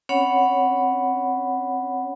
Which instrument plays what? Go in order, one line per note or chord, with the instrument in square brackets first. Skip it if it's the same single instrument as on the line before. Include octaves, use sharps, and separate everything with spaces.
[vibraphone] C4 C#4 C#5 F#5 B5